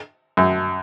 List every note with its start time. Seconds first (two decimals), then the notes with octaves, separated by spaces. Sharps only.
0.37 F#2